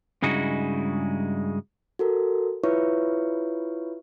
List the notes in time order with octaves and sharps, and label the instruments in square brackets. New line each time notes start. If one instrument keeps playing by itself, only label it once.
[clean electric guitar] G2 C#3 G#3 D#4 E4 F#4
[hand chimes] F#4 A4 A#4
E4 F4 B4 C#5 E5 C#6